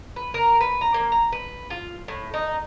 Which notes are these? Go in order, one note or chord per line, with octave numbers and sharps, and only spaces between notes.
B4
A#4
B4
A#5
A#3
A#5
B4
F4
A2
D#4